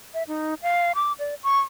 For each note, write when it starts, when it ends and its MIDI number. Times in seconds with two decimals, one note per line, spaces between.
0.14 0.23 76
0.28 0.54 63
0.62 0.92 77
0.95 1.12 86
1.19 1.35 74
1.43 1.60 85